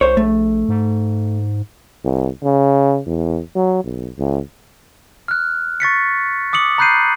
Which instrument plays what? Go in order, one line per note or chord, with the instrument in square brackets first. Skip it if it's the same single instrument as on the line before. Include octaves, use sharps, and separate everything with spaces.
[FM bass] C2 [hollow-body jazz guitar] C5 C#5
[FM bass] A#1 [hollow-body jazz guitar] A3
[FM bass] G#2
[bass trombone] C2
C#3
E2
F#3
B1
C#2
[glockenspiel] F6 F#6
C#6 A6 B6 C#7
D6 D#6 C#7 F#7
A#5 B5 F#6 G6 C7 D#7